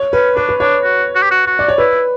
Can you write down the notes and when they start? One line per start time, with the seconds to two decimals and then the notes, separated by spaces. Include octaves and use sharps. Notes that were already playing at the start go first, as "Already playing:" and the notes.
Already playing: C#5
0.13 C#4 B4
0.36 D4 B4
0.49 B4
0.60 D4 C#5
0.83 F#4
1.15 F#4
1.23 G4
1.31 F#4
1.47 F#4
1.59 D5
1.68 C#5
1.78 E4 B4